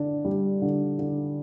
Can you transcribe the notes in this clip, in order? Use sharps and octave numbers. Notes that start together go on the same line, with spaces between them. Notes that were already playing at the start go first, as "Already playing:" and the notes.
Already playing: D3 D4
G3
D3
D3